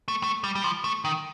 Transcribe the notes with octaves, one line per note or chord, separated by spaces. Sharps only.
A3
A3
G3
G3
F3
A3
D#3